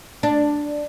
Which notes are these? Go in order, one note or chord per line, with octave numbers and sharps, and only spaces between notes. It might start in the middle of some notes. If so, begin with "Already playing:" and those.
D4